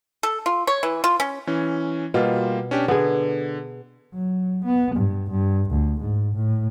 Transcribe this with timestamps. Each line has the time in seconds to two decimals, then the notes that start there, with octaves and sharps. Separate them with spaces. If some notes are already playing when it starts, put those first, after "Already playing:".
0.23 A4
0.46 F4
0.67 C#5
0.83 E3
1.04 F4
1.20 C#4
1.47 E3 C#4
2.14 B2 G3 A#3 F4
2.71 C#4 D4 G4
2.88 D3 B3 G#4
4.14 F#3
4.65 B3
4.96 G2
5.30 G2
5.70 D2
6.01 G#2
6.35 A2